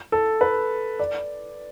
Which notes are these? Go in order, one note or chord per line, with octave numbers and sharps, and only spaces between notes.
A4
B4
D5